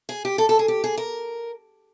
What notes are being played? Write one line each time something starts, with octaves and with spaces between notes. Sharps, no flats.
G#4
G4
A4
A4
G#4
G4
G#4
A#4